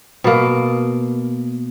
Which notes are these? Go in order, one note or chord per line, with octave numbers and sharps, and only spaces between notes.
B2 A#3